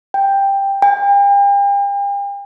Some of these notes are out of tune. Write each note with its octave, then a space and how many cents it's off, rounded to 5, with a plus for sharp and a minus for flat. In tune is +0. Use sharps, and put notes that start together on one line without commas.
G5 +10
G5 +40